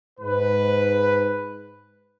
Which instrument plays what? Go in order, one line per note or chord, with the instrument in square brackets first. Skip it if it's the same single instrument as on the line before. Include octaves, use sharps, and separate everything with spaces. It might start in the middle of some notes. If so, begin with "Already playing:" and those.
[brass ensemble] G#2 B4